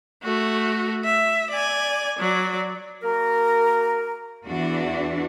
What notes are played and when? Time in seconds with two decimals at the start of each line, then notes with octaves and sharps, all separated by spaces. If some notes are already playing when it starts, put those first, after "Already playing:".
0.23 A3 F#4
1.05 E5
1.51 D5 G#5
2.20 F#3 D5
3.03 A#3 F#4 A#4
4.46 E2 E3 D4 F#4